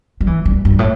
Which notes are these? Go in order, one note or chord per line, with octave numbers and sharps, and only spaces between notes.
G3
E3
G3
G2
A2